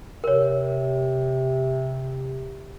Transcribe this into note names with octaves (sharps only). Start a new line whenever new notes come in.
C3 A#4 C#5